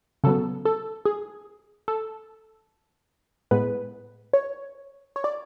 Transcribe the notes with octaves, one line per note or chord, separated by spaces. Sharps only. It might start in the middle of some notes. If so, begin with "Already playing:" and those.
C#3 F#3 B3 A4
A4
G#4
A4
A2 G#3 B3 B4
C#5
C#5
D5